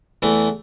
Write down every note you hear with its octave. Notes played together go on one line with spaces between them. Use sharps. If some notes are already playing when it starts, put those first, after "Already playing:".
E2 E3 A3